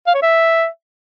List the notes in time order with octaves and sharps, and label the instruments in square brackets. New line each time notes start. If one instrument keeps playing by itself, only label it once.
[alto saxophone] F5
C#5
E5